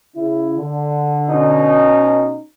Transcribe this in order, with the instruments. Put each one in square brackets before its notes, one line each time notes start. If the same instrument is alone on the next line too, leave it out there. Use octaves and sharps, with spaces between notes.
[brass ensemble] C#3 E4
D3
[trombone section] B2 C#4 D#4